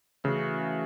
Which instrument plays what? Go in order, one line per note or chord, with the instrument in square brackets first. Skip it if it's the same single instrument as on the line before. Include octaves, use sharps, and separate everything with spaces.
[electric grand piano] C#3 [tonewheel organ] E3 A3 C#4 F#4